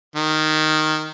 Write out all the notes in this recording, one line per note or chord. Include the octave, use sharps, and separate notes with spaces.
D#3